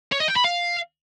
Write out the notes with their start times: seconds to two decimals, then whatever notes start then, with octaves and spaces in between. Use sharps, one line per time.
0.12 C#5
0.20 D#5
0.28 G5
0.36 B5
0.44 F5